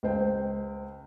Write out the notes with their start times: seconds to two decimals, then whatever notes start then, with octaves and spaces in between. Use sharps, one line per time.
0.03 C#2 C5 G5